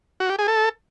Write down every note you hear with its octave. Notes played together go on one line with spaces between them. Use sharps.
F#4
G4
G#4
A4